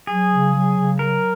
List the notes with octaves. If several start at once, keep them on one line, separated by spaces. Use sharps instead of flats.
F#3 G#4
C#3
F#3
C#3
F#3 A#4